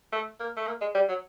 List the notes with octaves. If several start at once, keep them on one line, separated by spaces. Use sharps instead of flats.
A3
A#3
A3
A#3
G#3
G3
F#3